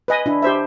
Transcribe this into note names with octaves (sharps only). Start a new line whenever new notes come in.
B4 D#5 G#5
D4 E4
G4 C5 E5